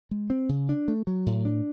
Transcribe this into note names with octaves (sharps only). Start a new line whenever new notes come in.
G#3
C4
C#3
D4
A3
F#3
A2
D4